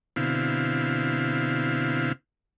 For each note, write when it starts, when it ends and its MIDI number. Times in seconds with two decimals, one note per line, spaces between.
0.16 2.12 47
0.16 2.12 50
0.16 2.12 60
0.16 2.12 64
0.16 2.12 77